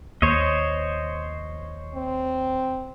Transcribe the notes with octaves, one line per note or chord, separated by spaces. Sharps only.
D#2 C5 C#5 D#5
C4